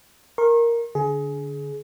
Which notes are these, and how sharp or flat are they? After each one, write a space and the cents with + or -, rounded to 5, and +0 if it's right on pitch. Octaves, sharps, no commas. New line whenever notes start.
A#4 +0 C#6 -45
D3 -20 G#4 +20